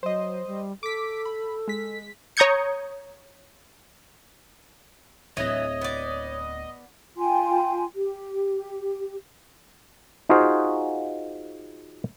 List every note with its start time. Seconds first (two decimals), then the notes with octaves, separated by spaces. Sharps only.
0.03 F#3 C5 D#5
0.47 G3
0.83 A4 D6 B6
1.25 B5
1.68 G#3 B6
2.37 C#5 A#5 D#6 G6 G#6 C#7
5.37 D1 E3 E4 C#5 D#5
5.81 B3 D5
7.18 F4 G5 G#5 C6
7.95 G4
10.29 D#4 F4 F#4 G#4 C5 F5